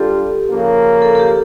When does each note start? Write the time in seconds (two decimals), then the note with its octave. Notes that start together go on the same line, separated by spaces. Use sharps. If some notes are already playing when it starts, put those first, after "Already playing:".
Already playing: G3 D4 F4 G4 A4
0.48 C#3 F3 A#3
1.02 A4
1.15 A4
1.19 G4